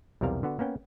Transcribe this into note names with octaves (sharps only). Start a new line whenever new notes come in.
B1 E2 C3 G3 A#4 F5
D3 B3 F#4
A#3 B3 C#4 G5